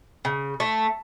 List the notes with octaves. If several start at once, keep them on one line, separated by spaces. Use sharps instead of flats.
C#3
A3